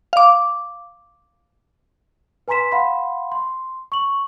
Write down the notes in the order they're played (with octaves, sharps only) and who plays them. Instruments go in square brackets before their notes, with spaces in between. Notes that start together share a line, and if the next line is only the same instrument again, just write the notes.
[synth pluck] F5 D6
[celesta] B4 G#5 A#5 C6 B6 E7
F5 F#5 B5 C6
C6
C#6 F#7